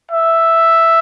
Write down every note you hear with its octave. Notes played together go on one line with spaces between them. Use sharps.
E5